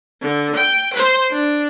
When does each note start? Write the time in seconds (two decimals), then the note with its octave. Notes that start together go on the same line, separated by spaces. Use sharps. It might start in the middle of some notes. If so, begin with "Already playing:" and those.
0.21 D3
0.55 G5
0.94 C5
1.31 D4